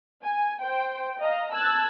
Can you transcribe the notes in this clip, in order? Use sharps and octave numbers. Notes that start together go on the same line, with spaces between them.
G#5
C5 G5
D#5 F5 A#5
A5 E6 F#6 G#6 A6